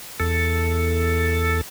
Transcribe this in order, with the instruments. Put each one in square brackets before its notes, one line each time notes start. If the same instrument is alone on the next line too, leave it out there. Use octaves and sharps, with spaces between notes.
[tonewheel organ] E2 A4